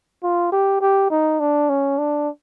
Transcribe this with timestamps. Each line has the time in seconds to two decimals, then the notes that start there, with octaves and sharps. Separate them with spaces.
0.23 F4
0.52 G4
0.81 G4
1.10 D#4
1.40 D4
1.69 C#4
1.98 D4